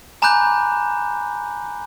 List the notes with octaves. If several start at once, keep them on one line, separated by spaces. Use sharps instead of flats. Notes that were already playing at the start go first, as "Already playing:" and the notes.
G#5 A#5 B5 D6 F#6 G6